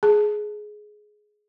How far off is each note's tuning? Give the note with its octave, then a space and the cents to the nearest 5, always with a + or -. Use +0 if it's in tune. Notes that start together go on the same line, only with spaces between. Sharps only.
G#4 +15 A5 +0